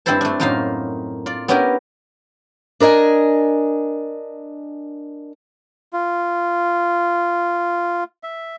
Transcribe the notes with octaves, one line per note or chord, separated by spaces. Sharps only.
G2 C4 E4 A4 C5 A5
A3 D4
F#2 A2 A#3 D#4 F4 F5
F4 D5
B3 C#4 D4 E4 G4 A#4
D4 A#4 D#5 G#5
F4
E5